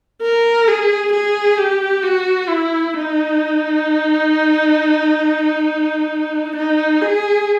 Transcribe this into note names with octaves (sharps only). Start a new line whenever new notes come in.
A#4
G#4
G#4
G4
F#4
E4
D#4
D#4
G#4